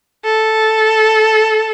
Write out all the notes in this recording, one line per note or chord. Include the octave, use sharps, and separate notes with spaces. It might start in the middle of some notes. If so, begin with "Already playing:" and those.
A4